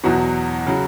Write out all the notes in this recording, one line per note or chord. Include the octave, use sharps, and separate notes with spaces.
E2 B2 F#3 F#4
C#3 F#3